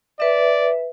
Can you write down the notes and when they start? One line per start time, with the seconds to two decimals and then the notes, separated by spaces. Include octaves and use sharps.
0.20 B4 D5 E5